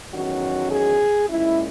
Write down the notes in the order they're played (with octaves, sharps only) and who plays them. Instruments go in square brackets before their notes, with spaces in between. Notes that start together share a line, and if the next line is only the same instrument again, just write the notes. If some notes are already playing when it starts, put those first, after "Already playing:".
[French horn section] E2 D#3 F#3 C#4 F#4
G#4
A#2 G#3 C#4 E4